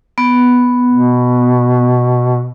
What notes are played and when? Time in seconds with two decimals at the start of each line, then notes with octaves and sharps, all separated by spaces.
0.18 B3
0.91 B2